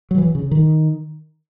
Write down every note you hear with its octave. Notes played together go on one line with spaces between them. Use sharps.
F#3
E3
C#3
D#3